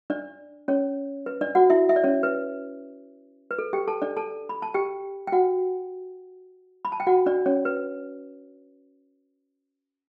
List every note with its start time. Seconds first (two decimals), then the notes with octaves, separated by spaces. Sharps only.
0.10 D4 D5
0.68 C#4 C#5
1.26 B4
1.41 D4 D5
1.55 F#4 F#5
1.70 E4 E5
1.89 E5
1.96 D5
2.04 C#4 C#5
2.23 B4
3.51 B4
3.59 A4
3.73 G4 G5
3.87 A4 A5
4.02 D4 D5
4.17 A4 A5
4.49 B5
4.62 A5
4.74 G4 G5
5.27 G5
5.32 F#4 F#5
6.85 B5
6.92 A5
7.00 G5
7.07 F#4 F#5
7.26 D4 D5
7.46 C#4 C#5
7.65 B4